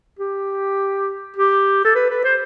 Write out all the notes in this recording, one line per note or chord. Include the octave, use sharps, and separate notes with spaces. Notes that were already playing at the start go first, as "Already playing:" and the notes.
G4
G4
A4
B4
B4
C5